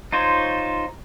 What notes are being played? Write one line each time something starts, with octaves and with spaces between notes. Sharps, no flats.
D#4 F4 C5 C#5